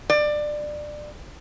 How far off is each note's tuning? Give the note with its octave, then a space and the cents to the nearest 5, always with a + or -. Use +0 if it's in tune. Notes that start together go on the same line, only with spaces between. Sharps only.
D5 +20